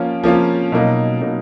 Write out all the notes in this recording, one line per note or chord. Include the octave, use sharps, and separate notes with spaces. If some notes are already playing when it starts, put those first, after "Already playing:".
Already playing: F3 A#3 C#4 F4
F3 A#3 C#4 F4
B2 F#3 A#3 D#4
B2 F#3 A#3 D#4